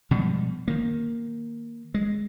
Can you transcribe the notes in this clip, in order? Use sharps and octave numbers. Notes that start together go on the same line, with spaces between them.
B2 F3 G3 G#3
D#3 A#3
G#3